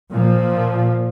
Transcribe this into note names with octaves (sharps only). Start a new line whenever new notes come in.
A#2 F3